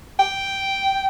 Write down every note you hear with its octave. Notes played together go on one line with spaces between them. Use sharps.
G5